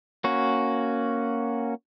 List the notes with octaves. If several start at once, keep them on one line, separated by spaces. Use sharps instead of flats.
A#3 C#4 F#4